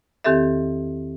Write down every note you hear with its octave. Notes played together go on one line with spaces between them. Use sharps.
E2 D#3 C4 G4 A4 E5